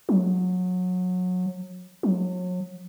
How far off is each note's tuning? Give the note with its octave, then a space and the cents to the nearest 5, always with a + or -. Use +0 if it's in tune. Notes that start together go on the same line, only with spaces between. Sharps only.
F#3 -25
F#3 -35